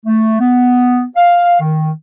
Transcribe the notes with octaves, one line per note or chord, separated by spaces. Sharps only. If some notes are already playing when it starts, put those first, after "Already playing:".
A3
B3
F5
D#3